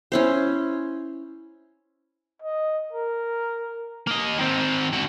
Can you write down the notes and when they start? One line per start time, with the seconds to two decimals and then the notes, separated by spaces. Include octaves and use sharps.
0.12 C#4 E4 C5
2.42 D#5
2.93 A#4
4.07 A#3 D#5
4.38 D#3 C4
4.93 D3 F#4